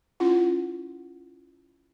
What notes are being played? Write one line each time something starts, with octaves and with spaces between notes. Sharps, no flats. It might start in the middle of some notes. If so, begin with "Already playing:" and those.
C#4 E4 F4 F#5